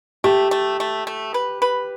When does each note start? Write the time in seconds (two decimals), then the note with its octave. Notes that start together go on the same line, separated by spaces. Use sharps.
0.24 A3 G4
0.51 A3
0.80 A3
1.07 A3
1.34 B4
1.62 B4